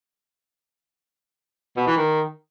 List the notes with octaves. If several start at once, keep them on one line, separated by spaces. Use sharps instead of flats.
B2
E3
D#3